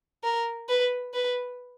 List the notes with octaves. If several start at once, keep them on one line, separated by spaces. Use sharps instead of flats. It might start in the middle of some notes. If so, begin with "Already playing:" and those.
A#4
B4
B4